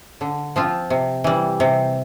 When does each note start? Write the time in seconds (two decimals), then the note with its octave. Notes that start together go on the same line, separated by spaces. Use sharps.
0.21 D3
0.56 F3 C4 F4
0.90 C3
1.24 E3 G3
1.60 C3